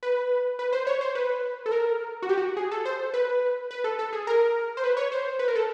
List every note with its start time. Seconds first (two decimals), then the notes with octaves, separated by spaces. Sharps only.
0.03 B4
0.59 B4
0.73 C5
0.87 C#5
1.01 C5
1.15 B4
1.66 A4
1.71 A#4
2.22 F#4
2.29 G4
2.38 F#4
2.57 G#4
2.71 A4
2.85 C5
3.14 B4
3.71 B4
3.84 A4
3.99 A4
4.13 G#4
4.27 A#4
4.77 C5
4.84 B4
4.97 C#5
5.12 C5
5.39 B4
5.48 A#4
5.56 A4